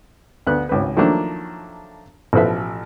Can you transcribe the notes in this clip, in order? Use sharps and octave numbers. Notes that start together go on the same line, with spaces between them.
D2 B3 F#6
G#1 C#2 B4
D#3 F3 F#3 A3 A#3 D4
A1 B2 F3 A4 B4 E5